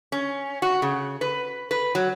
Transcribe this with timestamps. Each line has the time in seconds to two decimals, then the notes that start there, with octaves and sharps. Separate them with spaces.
0.12 C#4
0.62 F#4
0.82 C#3
1.21 B4
1.71 B4
1.95 F#3